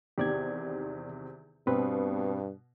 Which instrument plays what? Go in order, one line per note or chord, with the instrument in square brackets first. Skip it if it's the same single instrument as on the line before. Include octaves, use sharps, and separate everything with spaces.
[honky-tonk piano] E2 C3 D#3 [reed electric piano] G4 D5 G#6
[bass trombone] G2 [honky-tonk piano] B2 [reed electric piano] C4 B4